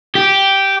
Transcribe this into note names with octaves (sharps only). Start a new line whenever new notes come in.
G4